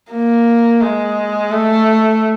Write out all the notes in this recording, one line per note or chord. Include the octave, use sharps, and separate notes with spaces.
A#3
G#3
A3